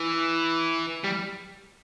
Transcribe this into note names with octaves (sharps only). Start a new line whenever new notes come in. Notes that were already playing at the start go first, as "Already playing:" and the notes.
Already playing: E3
G3